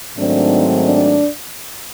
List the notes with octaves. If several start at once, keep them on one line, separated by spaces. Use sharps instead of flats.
G#2 D#3 F#3 A3 C4 D4
D4